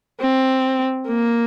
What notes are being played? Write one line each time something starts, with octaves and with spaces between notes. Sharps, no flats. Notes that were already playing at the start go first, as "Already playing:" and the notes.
C4
A#3